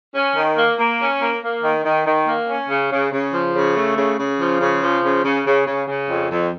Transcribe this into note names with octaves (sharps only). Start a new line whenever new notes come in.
C#4
D#3
A#3
A#3
C#4
A#3
A#3
D#3
D#3
D#3
A#3
C#4
C#3
C#3
C#3
F3
C#3
A3
C#3
C#3
F3
C#3
F3
C#3
C#3
C#3
C#3
C#3
F2
F2